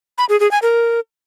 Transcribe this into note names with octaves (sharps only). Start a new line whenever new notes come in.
B5
G#4
G#4
G#5
A#4